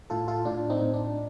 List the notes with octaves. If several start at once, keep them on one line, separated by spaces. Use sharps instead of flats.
A2 F4 A4
F4 A4
A2 D4 F4
C4 D#4
A2
D4